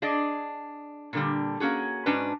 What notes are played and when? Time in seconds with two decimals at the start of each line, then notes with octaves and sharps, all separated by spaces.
0.02 D4 G#4 D5 D#5
1.13 A#2 D3 G3
1.60 A#3 C#4 F#4 G#4
2.06 G#2 C#4 D4 F#4 B4